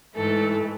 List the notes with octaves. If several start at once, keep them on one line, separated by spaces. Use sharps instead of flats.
G#2 E3 A3 A4